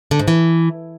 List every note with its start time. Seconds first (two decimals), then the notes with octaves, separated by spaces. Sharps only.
0.11 D3
0.19 G#2
0.28 E3